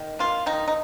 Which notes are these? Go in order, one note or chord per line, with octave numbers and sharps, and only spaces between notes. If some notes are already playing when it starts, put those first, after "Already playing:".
Already playing: D#3
A#3 F4
D#3 D#4
D#4